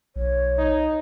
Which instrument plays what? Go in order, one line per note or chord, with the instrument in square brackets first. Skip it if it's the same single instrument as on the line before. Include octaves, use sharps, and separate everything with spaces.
[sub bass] B1 [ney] C#5
[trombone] D#4